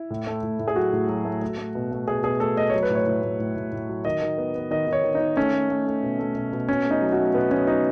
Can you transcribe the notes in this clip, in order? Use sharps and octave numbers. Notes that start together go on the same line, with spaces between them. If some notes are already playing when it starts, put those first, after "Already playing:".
Already playing: E4
A2
A3
A2
A2
G#4
F#3 F#4
A2
F#3
A3
A3
A3
B2
A3
B2 G#4
B2 G#4
A3 A4
A3 D#5
F#3 C#5
B4
A2
C#5
A2
A2
A2
A2
A2
F#3
D#3 D#5
D#3
B3
B3
D#3 D#5
D#3
C#5
D#3
D#4
D#3
A3 C#4
A3
A3
A3
B2
A3
B2
B2
B2 C#4
A3
D#4
F#3
F#4
A3
B2 B3
F#3 C#4
F#3 D#4